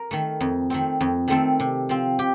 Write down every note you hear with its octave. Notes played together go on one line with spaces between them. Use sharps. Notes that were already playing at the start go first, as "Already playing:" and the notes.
Already playing: A#4
D#3 A3
F2
D#3 A3 C4
F2
D#3 A3 C4 A4
C3
F3 C4
G4